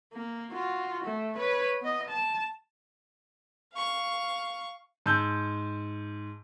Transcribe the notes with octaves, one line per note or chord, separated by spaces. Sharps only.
A#3
F4 F#4
A3
B4 C#5
B3 D#5
A5
F5 C#6
G#2 A5 E6 G6 G7